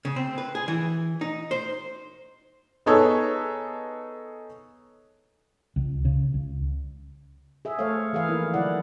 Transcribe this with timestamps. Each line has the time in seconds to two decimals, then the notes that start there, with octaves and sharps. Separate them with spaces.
0.05 C#3
0.16 C4
0.38 B4
0.55 G#4
0.68 E3
1.21 D#4
1.51 C5
2.86 B3 D#4 G#4 A4 B4 C#5
5.76 C#2
6.05 C#3
6.34 C#2
7.65 G#4 E5
7.79 A3 A4 C5 C#5 F5
8.13 E3 G#4 B4 F5
8.28 F3 A#3 D#4 E4 A#4
8.54 D3 F#3 E4 D5 F#5